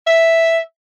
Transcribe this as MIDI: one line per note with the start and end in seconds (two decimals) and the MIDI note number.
0.07 0.59 76